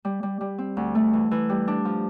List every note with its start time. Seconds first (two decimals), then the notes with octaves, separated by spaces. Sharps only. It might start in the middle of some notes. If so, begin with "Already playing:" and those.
0.05 G3
0.23 G3
0.41 G3
0.58 C4
0.77 D2
0.95 A3
1.13 E3
1.31 E3
1.50 G3
1.68 D4
1.85 F3